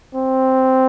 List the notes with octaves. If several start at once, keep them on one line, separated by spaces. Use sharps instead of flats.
C4